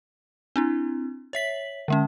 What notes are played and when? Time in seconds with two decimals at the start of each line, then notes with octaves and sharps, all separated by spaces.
0.56 C4 D4 E4
1.33 C#5 E5 B6 F#7
1.88 D3 G#3 C#4